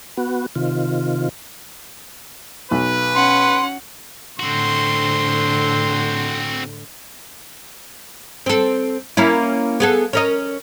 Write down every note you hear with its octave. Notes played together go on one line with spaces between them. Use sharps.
B3 F#4
C3 D#3 F4
B1 B4
C#4 F#5 C6
A2 D3 C4 F#4 C6
C4 A4
A#3 C#4 E4
B3 G#4 A4
C#4 A#4 D#5